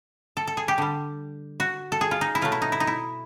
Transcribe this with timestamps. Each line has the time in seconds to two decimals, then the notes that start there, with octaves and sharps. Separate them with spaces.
0.37 A4
0.47 A4
0.57 G#4
0.68 G4
0.78 D3 G3
1.60 F#4
1.92 A4
2.01 G#4
2.11 F4
2.21 D#4
2.35 E4
2.41 B2 F#3 A3 F4
2.52 E4
2.62 D#4
2.72 E4
2.80 D#4
2.87 E4